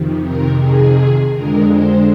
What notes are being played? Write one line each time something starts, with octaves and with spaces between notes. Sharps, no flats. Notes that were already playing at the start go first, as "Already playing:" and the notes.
Already playing: F2 C3 D#3
A#4
G#4
F2 D3 G#3 A#4
C5